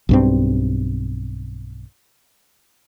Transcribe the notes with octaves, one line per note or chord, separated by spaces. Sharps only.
B1 G2 C4